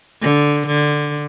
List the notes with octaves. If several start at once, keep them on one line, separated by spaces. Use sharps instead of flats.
D3
D3